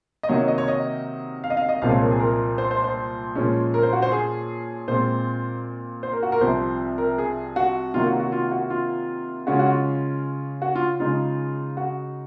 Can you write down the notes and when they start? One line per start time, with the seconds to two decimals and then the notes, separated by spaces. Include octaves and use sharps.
0.23 D#5
0.29 C3 D#3 F#3 A#3 D#4 C#5
0.48 D#5
0.58 C#5
0.68 D#5
1.44 F5
1.50 D#5
1.57 F5
1.69 D#5
1.82 C2 A#2 F3 G#3 C4 F5
1.92 C#5
2.01 A#4
2.11 G#4
2.20 A#4
2.58 C5
2.71 C5
2.84 C5
3.35 A#2 F3 G#3 C#4
3.74 A#4
3.83 C5
3.93 F#4
4.02 C5
4.12 G#4
4.88 A#2 G#3 C4 F4 C5
6.03 C5
6.13 A#4
6.23 F#4
6.32 A#4
6.41 C2 C3 F3 C5
6.98 A#4
7.18 G#4
7.56 F#4
7.94 C3 D#3 F#3 A#3 F4
8.06 F#4
8.20 F#4
8.32 F4
8.51 F#4
8.70 F4
9.47 C#3 G#3 C#4 F4 F#4
9.59 F#4
9.66 F4
10.62 F#4
10.75 F4
11.00 C#3 G#3 D#4 F4
11.77 F#4